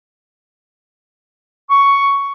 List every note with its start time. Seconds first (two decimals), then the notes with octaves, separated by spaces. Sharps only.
1.70 C#6